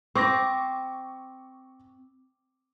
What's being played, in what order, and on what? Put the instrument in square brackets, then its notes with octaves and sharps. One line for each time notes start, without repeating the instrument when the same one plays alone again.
[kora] C4 [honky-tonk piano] C#6 D6 A#6